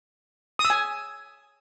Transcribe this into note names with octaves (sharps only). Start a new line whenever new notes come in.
D#6
E6
G#5